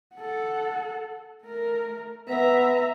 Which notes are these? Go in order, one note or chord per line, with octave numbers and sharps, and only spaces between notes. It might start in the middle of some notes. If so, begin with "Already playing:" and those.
A4 F#5
A3 A#4
B3 E5 A#5